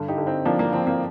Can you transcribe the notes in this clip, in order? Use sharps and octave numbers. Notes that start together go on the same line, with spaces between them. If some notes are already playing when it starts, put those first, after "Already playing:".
Already playing: G2 D3
D#4 G4
D3
C4 D#4
F3 A#3 D4
A#3
F3 C4
A#3